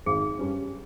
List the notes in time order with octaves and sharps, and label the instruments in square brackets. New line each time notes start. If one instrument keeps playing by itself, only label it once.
[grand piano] G#1 [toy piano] G#4
[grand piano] G2 G3 C#4